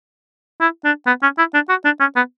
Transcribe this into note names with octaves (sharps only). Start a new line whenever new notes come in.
E4
D4
B3
C#4
E4
D4
F#4
D4
C#4
B3